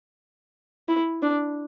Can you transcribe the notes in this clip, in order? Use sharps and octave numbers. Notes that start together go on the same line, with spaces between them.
E4
D4